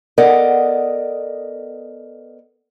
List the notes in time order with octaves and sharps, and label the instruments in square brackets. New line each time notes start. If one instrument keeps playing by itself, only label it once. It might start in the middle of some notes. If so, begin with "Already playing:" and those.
[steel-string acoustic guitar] B3 A4 A#4 D5 D#5 F#5